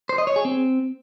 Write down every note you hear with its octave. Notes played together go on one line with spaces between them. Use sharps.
C5
D#5
C#5
G#4
C4